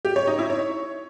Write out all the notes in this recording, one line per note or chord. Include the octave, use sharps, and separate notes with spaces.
G4
C#5
D#4
E4
C#5